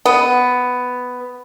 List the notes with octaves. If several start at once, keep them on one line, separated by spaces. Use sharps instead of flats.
B3